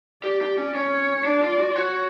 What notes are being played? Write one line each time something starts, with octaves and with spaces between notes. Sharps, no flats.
G4 D5
G4
C#4
C#4 C#5
D4 D5
F4
F#4
F4
F#4 C#5